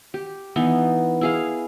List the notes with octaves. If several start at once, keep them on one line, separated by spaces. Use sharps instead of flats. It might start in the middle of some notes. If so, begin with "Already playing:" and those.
G4
E3 B3 D#4
E4 G#4 F5